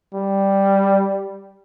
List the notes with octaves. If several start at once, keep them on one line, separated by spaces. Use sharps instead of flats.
G3